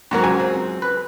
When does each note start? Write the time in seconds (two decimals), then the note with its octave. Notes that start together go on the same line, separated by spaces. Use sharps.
0.11 G#2 F#3 A#4
0.24 C#2 F#2 G#5
0.39 C4
0.82 B4